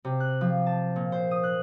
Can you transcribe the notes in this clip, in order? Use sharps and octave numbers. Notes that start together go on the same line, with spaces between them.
C3
F#6
F3
A5
A#2
C5
D#6
F#6